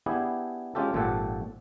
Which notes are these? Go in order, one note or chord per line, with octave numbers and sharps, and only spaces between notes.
B3 D4 E4 G4 G#4
G#3 C#4 F4 G4 A4
G#1 A#2 F3 G4 A4 F#5